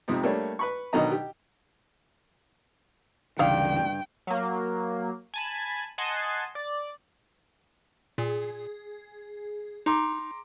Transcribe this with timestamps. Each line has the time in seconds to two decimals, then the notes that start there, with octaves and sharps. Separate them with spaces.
0.08 F2 G#2 C3
0.23 G3 A3 A#3 D4 C#5
0.59 B4 B5 C#6
0.93 B2 D3 D#3 F#3 D#5 A#5
1.11 G4
3.39 D2 G2 C#3 E3 D#4 F5 G5
4.27 F#3 A#3
5.34 G#5 A5 B5
5.98 D#5 F#5 G#5 A5 C6
6.55 D5
8.18 A#2 G#4
9.86 D#4 A#5 C6 D6